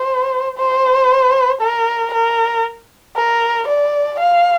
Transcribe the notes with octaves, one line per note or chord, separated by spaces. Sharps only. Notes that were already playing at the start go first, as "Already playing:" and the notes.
Already playing: C5
C5
A#4
A#4
A#4
D5
F5